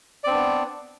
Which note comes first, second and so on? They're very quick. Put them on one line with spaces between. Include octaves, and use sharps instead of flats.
D5 C4 D4 B3